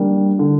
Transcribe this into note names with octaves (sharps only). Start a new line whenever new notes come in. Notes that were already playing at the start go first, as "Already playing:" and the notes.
Already playing: G3 A#3 D4
D3